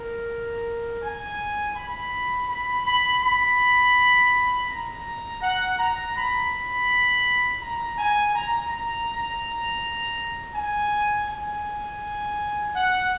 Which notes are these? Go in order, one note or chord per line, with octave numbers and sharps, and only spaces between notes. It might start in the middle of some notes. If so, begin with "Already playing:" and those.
Already playing: A#4
G#5
B5
B5
B5
B5
A#5
F#5
A#5
B5
A#5
G#5
A#5
A#5
G#5
G#5
F#5